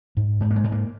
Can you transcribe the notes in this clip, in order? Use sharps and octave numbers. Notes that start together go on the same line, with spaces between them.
G#2
G#2
A#3
G#3
G#2
A#3